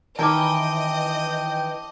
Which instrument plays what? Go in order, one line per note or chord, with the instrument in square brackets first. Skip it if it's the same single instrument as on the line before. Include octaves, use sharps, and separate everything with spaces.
[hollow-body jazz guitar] D#3 A#4 [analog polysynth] E3 G5 [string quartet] D#5 [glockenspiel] A5 D6